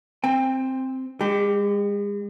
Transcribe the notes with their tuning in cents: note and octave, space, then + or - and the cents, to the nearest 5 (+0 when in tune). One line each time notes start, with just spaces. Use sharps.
C4 +0 G5 +30
G#3 -40 G4 +0